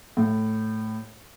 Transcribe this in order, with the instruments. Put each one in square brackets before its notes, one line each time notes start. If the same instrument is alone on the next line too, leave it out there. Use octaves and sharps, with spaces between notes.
[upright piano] A2